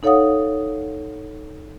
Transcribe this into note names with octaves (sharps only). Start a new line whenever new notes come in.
D#4 A4 C#5 F5 F#5 D#6